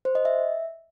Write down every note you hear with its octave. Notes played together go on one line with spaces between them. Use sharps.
C5
D#5
E5